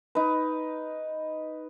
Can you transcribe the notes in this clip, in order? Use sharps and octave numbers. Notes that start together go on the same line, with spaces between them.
D#4 B4